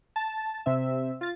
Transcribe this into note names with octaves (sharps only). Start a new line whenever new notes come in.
A5
C3 C4 E5
F4 A6